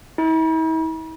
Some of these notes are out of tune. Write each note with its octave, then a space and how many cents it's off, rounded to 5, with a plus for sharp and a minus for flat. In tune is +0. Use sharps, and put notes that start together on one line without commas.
E4 -45